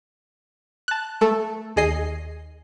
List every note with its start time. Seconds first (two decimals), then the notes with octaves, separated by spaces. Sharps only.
0.88 A5 F#6
1.21 A3 A4
1.76 D#2 G#4 D#5 C7